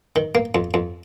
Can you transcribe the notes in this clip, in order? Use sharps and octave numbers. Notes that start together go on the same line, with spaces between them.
D#3
A#3
F2
F2